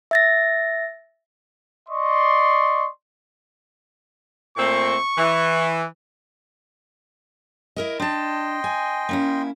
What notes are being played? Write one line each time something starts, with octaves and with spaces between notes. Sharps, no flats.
E5 A6 A#6
D5 D#5 C6 C#6
A#2 A3 C4 C#6
E3
E4 A#4 D#5
D4 D#5 G5 A5 C6
G#5
A#3 C#4 E4